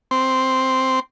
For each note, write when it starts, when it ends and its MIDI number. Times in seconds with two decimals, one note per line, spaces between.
0.11 1.00 60